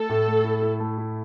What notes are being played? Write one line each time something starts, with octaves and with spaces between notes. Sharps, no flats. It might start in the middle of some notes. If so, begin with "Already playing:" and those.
Already playing: A3 A4
A2
A3
E4
E4
A3
E4